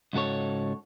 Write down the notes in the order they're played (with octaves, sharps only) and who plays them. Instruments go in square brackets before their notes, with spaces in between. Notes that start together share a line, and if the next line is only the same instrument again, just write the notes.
[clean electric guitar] C#2 G#2 F#4 A4 C#5